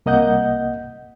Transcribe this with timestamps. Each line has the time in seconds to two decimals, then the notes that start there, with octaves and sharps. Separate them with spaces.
0.06 C2 A#3 D#5 F#5 G6